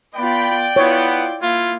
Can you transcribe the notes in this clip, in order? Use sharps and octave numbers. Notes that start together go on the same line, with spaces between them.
B3 F4 D5 G5 B5
B3 E4 F4 C#5
A#3 E4 F4